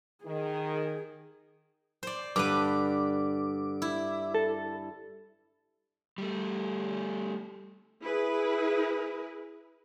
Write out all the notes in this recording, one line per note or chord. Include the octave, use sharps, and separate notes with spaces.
D#3 G#4
C5 D5
G2 D3 B4 D6
E4
A4
G3 A3
E4 G#4 B4